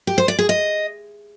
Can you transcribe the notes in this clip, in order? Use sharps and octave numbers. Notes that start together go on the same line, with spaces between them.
G4
C5
D5
G#4
D#5